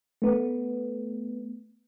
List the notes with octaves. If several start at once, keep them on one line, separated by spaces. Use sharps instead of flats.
A3 B3